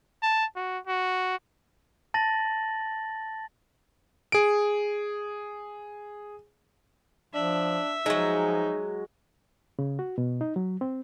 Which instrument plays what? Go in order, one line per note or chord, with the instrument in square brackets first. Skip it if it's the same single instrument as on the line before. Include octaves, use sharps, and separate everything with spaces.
[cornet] A5
F#4
F#4
[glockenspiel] A5 A6 A#6 F#7
[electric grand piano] G#4 D7
[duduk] F3 [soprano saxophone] D4 [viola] E5
[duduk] F3 [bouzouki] F#3 G#3 [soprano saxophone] D#4
[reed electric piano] C#3
F#4
B2
D#4
F#3
C4